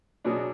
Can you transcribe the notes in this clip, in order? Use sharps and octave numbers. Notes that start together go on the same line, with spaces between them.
B2 F#3 B3 D4 G#4